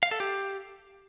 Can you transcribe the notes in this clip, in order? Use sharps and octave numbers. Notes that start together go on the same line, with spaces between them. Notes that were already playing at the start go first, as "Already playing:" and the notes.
F5
A4
G4